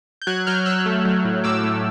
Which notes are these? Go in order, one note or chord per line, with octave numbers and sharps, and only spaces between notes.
G6
F#3 F#6 G#6
F#3 F6 G6
F#3 E6 F#6
A3
F#3
A2
A2 D6 E6
A3